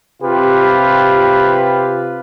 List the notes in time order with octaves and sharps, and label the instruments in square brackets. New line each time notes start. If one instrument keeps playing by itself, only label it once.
[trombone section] C3 F4 G4 B4